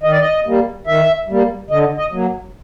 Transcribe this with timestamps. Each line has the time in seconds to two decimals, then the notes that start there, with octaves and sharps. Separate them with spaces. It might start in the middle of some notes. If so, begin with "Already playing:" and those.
0.03 D#3 D#5
0.12 D5
0.20 D#5
0.46 G3 A#3
0.87 D#3 E5
1.28 G3 A#3
1.70 D3 D#5
1.98 D#5
2.12 F#3 A#3